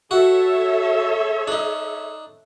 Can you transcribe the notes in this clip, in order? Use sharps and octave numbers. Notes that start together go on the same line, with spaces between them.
F#4 A4 C#5 E5
D4 D#4